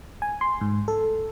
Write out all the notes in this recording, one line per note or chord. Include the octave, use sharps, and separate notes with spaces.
G#5
C6
G#2
A4